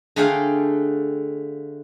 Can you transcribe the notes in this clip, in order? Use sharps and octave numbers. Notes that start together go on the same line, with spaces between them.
D3 A3 G#4 F5 G5